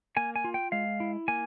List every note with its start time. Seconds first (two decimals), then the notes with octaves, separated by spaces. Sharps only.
0.17 A#3 G#5
0.36 G#5
0.44 F4
0.54 G5
0.72 G#3 F5
1.00 E4
1.28 A#3 G#5